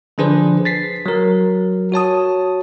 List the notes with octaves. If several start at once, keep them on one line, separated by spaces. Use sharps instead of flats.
D3 F3 D4 G#4 B4 C5
A6 B6 C7
F#3 A#4
F#4 C#5 A5 D#6